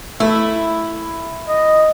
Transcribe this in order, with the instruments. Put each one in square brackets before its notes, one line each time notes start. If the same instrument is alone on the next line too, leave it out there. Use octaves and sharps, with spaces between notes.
[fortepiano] A3 [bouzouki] E4
[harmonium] D#5